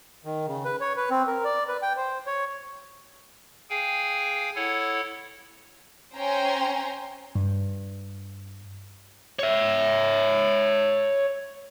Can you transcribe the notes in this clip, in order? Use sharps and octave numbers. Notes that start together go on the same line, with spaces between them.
D#3
C#3
B4
C#5
B4
C4
A#4
D5
B4
G5
C5
C#5
G#4 F5 G5 G#5
E4 A4 C#5 F#5
C#4 C5 G5 G#5 A#5 C6
G2
C#5 E5